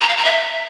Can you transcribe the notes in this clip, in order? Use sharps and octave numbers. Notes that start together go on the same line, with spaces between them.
A#5
F5
A#5
E5